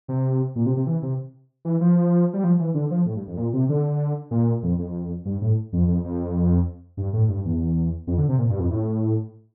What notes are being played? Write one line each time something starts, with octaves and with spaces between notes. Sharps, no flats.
C3
A#2
C3
C3
E3
C3
E3
F3
G3
F3
E3
D3
F3
A2
G2
F2
A#2
C3
D3
A#2
F2
F2
G2
A2
F2
F2
F2
G2
A2
G2
E2
F2
D3
C3
A#2
G2
F2
A2